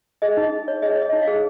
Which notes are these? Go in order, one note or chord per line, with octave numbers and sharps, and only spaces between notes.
G#4 D#5
D#4
D#4
C#5
G#4 D#5
C#5
D#5
D#4
F5
G#4